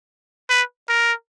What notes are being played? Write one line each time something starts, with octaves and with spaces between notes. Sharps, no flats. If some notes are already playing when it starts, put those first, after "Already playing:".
B4
A#4